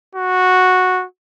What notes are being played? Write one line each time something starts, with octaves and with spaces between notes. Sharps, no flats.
F#4